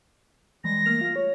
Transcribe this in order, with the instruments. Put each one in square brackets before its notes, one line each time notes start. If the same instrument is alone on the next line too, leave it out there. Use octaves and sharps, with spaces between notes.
[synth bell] E3 G3 G#3 [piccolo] A#6
[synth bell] A3 F6 F7 [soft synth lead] A#3
[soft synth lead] F4
C#5